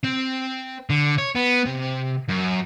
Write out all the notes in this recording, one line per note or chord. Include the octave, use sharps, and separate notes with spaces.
C4
D3
C#5
B3
C3
F#2